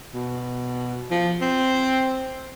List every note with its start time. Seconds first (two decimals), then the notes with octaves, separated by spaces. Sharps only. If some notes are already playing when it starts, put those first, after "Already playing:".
0.14 B2
1.11 F3
1.41 C4